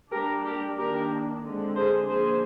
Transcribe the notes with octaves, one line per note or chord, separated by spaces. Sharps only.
G3 A#3 D4 G4 A#4
G4 A#4
D#3 A#3 D4 G4 A#4
D3 G#3 C4
G#4 C5
D3 F3 A#3 G#4 C5